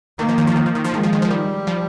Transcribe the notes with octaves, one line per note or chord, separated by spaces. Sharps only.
D#3 A#3
F3
D#3
F3
D#3
F3
D#3
F3
D#3 G#3
F3
D#3
F3
D#3 G3
F3